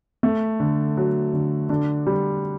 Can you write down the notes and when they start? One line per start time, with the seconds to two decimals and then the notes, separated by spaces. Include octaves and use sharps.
0.23 A3
0.60 D3
0.97 F#3
1.33 D3
1.69 D3 D4
2.07 G3